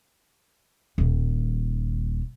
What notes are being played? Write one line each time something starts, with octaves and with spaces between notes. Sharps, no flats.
D#1 G3